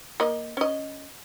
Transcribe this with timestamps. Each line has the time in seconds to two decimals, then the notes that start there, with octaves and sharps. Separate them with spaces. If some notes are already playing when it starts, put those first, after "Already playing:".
0.20 A#3 D#5
0.57 C#4 D#5